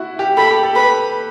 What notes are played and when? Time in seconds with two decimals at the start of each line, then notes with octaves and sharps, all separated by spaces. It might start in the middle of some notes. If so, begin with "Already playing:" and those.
Already playing: E4 F#4
0.19 G4
0.37 A4 B5
0.51 G4
0.63 A4
0.76 B4 B5